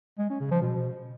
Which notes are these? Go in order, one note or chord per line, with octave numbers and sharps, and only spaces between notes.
G#3
C#4
C#3
F3
B2